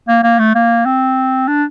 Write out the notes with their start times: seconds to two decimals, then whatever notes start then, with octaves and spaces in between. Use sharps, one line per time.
0.08 A#3
0.23 A#3
0.39 A3
0.55 A#3
0.86 C4
1.48 D4